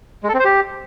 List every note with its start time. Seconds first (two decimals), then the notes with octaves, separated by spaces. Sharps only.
0.23 G#3
0.29 A4
0.34 C4
0.39 C5
0.45 G4